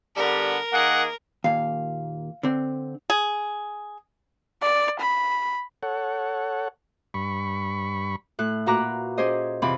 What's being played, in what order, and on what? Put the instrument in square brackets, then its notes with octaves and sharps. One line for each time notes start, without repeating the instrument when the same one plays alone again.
[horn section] D3 G3 B3 [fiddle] A#4
[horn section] D#3 A#3 G#4 [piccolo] F#5
[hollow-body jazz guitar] D#2 A#2 [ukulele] F5
[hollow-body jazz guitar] D3 C4
[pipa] G#4
[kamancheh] D5
B5
[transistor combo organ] A4 C#5 F#5
G2 B5 C#6
[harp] A2 A4 F#6
A#2 F#4 B4 A#5 D6 F#6
C#4 G4 G#4 C5 D#5
F2 C3 E3 C4 G4 B5